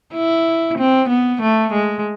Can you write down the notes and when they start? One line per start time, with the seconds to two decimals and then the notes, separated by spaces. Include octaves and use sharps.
0.14 E4
0.78 C4
1.09 B3
1.42 A3
1.72 G#3